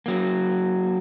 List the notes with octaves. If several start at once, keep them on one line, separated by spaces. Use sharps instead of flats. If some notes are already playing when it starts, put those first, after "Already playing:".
F#3 A#3